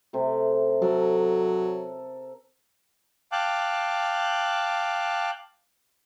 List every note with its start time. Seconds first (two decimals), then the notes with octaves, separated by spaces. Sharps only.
0.13 C3 A3
0.82 F#3 A4 A#4
3.32 F5 G5 A5 D6 F#6